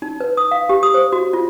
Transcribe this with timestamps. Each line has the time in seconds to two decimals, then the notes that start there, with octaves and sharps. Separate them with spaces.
0.02 D#4
0.21 B4
0.37 D#6
0.51 F5
0.69 G4
0.83 D#6
0.94 C5
1.12 F#4
1.33 F4